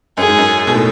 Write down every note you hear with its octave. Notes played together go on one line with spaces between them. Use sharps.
F#2 G#4
G#2
F#2
B2
A2